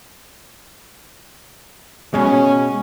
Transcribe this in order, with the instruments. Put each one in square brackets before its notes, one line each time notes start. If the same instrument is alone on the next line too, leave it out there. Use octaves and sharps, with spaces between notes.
[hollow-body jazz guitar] B2 G#3 [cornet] C#4